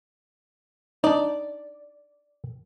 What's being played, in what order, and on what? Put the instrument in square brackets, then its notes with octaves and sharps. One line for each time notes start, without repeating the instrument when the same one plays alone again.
[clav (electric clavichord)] D4 D#4 [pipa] D5